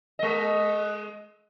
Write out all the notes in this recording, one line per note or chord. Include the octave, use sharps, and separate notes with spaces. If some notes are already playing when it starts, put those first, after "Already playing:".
G#3 D#5